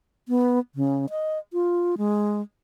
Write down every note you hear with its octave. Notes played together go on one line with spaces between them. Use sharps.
B3
C#3
D#5
F4
G#3